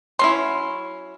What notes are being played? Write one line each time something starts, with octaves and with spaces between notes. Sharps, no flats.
F#3 C#4 E4 C6